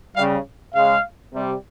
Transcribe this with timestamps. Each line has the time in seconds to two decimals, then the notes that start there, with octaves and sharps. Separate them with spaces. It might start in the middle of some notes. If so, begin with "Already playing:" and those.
0.16 C#3 G3 F5
0.75 C#3 G#3 F5
1.34 C3 G3